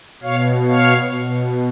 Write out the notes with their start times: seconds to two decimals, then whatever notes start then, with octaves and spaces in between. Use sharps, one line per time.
0.23 B2 C#5 F5
0.67 C#5 F5
1.11 B2